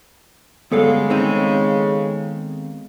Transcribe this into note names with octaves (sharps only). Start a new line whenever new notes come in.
D2 G2 C#3 G#3 B3 A4 F5
D#3 C4 D#4